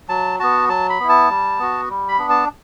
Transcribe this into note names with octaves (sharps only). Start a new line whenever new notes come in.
F#3 A5
B3 F#4 A5
F#3 A5
B5
B3 E4
A5
G3
B3 F#4
G3
B5
B3 D4
A5